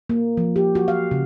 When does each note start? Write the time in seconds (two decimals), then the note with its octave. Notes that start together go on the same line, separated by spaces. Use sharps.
0.09 A#3
0.37 F3
0.56 G4
0.75 F#4
0.88 F5
1.11 C#3